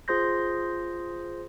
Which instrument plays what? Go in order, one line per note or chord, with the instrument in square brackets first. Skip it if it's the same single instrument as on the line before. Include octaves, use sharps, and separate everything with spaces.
[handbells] F4 G#4 C5 C6 G6 A#6